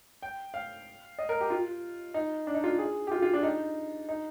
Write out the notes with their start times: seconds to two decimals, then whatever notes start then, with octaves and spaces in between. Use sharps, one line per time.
0.22 G5
0.54 F5
1.19 D#5
1.29 A#4
1.41 G4
1.50 F4
2.14 D#4
2.47 D4
2.55 D#4
2.64 F4
2.79 G#4
3.07 G4
3.12 F4
3.22 F4
3.33 D4
3.43 D#4
4.09 D#4